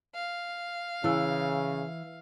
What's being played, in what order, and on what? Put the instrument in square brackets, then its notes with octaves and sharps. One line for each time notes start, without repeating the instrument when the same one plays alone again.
[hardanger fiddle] F5
[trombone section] C#3 [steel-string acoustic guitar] E3 [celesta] E4 E6